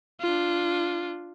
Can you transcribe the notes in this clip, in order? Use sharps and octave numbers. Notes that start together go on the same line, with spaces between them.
D4 F4